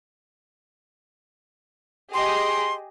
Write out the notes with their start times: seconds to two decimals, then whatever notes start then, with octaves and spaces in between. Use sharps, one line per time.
2.14 G4 G#4 D#5 C6